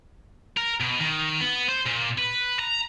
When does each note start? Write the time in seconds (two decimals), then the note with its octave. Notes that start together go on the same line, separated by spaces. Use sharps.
0.57 A#4
0.80 B2
1.00 D#3
1.41 B3
1.69 C5
1.86 A#2
2.18 B4
2.59 A#5